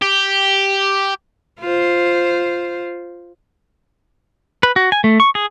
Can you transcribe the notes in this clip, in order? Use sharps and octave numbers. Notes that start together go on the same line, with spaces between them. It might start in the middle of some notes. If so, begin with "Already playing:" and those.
G4
F4 C5
B4
F#4
G#5
A3
C#6
G#4